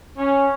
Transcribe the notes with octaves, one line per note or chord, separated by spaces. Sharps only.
C#4